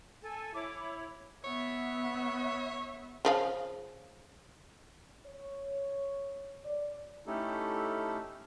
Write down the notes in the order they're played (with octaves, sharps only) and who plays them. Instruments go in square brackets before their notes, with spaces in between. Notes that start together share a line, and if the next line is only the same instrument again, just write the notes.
[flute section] A4 G#5
[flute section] E4 C#5 [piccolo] D6
[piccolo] B5
[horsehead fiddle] B3 E5 [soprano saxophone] C#5
[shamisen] C#3 F3 F5
[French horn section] C#5
D5
[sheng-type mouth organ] A3 C#4 D#4 E4 G4 A4